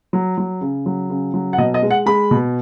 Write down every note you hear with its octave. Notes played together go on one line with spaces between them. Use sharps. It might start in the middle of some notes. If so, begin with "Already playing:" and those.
F#3
F#3
C#3
F#3
C#3
F#3
F#5
B2 D#5
D#5
G#3
F#5
G#3 B5
B2